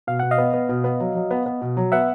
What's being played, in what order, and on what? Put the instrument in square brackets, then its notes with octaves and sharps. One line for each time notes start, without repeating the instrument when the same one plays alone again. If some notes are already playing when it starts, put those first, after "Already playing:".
[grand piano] B2 [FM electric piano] F5
[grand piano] B2 [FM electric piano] F#5
[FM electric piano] D#5 F5
[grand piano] B3
B3
B2
B3
F#3
F#3
B3
B3
B2
F#3
[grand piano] B3 [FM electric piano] E5 F#5